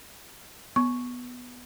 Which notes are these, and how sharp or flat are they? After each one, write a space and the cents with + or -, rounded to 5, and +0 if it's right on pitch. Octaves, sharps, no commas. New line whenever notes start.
B3 +0 C#6 +0